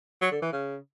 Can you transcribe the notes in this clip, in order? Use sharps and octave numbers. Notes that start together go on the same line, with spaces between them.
F#3
D3
E3
C#3